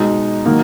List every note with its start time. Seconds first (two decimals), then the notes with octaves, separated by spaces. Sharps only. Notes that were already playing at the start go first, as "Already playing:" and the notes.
Already playing: B2 G#3 D#4
0.45 D#3 F#3 A#3